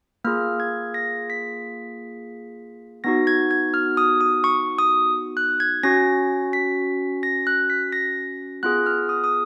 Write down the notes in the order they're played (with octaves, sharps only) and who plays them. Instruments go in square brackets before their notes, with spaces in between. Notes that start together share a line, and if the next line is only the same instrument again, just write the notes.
[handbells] A#3 F4 G#4 F6
G#6
A#6
B6
B3 D#4 F#4 A#6
G#6
G#6
F6
D#6
D#6
C#6
D#6
F#6
G#6
C#4 F#4 A#6
B6
A#6
F#6
B6
A#6
B3 F4 G#4 F#6
F6
D#6
D#6